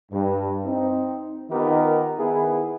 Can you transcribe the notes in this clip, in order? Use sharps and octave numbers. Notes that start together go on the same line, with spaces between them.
G2
C4 D#4
D#3 B3 D#4 F4 G4 A#4
D#3 B3 E4 G#4